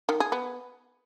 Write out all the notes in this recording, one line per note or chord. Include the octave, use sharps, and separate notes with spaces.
D#3
G#4
B3